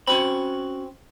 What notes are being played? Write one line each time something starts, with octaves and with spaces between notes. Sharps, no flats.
C4 C#4 F#4 B5